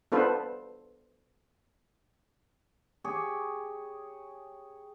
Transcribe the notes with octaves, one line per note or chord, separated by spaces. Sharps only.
B3 D4 F4 A4 B4 C5
G4 G#4 C#5